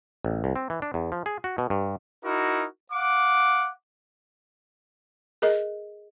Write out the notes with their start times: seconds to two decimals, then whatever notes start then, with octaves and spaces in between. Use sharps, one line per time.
0.25 A1
0.44 C2
0.56 C4
0.70 E3
0.82 D4
0.94 E2
1.12 F3
1.26 G#4
1.44 F#4
1.58 B2
1.70 G2
2.25 D#4 E4 F#4 A#4
2.92 F5 F#5 D6
5.42 G#4 A#4 D#5